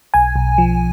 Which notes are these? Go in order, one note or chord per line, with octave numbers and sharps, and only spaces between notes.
B1 G#5
B1
F3